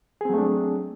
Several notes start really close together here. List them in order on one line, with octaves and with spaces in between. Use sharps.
G#4 C4 F#3 A3 D4